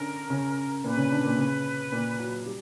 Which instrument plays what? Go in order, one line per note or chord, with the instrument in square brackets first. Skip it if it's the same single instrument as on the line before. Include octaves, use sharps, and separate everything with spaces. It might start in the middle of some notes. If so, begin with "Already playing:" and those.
Already playing: [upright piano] D3 C#4 D4 [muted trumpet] A#4
[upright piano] C#3 C#4
[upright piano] A#2 A#3 [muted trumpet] B4
[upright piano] C#3 C#4
D3 D4
A#2 A#3
C#3 C#4
A#2 A#3
F#3
G3